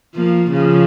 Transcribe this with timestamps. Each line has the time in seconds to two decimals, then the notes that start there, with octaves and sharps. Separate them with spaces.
0.15 F3 A#3
0.51 C#3 F3